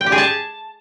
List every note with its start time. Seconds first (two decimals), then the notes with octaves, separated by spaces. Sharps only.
0.01 G5
0.06 G4
0.12 G#4
0.18 A5